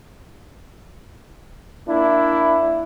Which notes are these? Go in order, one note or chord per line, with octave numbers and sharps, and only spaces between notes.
A#3 D4 E4